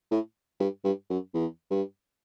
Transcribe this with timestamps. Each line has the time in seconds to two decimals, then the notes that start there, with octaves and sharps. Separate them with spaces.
0.11 A2
0.60 G2
0.84 G2
1.10 F#2
1.34 E2
1.70 G2